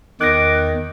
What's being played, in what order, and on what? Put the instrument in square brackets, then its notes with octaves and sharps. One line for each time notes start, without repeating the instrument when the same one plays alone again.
[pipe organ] E2 [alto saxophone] D#3 [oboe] D6 [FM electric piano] F#6 A#6